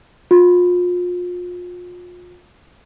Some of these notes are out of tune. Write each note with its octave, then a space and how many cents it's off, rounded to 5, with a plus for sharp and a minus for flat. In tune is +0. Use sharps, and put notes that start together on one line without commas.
F4 +35